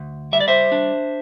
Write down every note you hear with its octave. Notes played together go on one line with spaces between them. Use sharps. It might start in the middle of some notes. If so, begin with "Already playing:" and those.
Already playing: D2
G3 E5
D5
C5 E5
D4